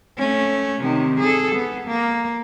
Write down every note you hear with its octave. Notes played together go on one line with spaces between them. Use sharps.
A3 C#4
C3 D#3
G#4 A4
B3
A#3